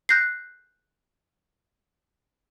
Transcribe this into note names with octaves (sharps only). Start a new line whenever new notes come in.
F#6 G6 A#6 C7